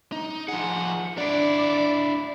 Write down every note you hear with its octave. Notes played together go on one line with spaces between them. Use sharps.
D#4
F3 G#4 F#5
D4 E4 D5